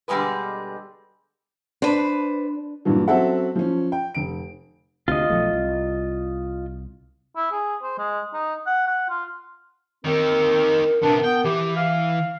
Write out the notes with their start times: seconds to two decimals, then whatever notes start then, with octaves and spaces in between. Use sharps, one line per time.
0.08 B2 D3 G3 G#3 G#4 B4
1.82 D4 B4 C5
2.85 G2 A#2 E3 F#3
3.08 F#3 C4 C#4 A4 E5 F#5
3.55 F3 C#4
3.92 G5
4.15 F1 D7
5.08 D2 C3 F4 D#5
5.30 B1 F3 A3
5.53 C2
7.36 E4
7.52 G#4
7.82 C5
7.98 G#3
8.33 D#4
8.66 F#5
8.87 F#5
9.09 F4
10.05 D#3 C4 G4 A#4
11.03 C3 B3 D4
11.24 B3 G5
11.44 E3 G4
11.76 F5